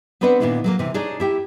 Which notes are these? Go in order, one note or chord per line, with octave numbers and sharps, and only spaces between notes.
B3 C4 D4 B4 D5 F#5
A#2 D#3 B3 D4 E4
F#3 G#3 A#3
C3 E3
D4 D#4 G#4 C#5 D5
E4 G4 G5